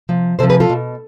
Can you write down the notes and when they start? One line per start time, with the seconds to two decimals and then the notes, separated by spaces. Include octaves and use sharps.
0.09 C3 F3
0.39 C3 A4 C5
0.43 F3
0.49 G#4 B4
0.60 F4 A4
0.70 B2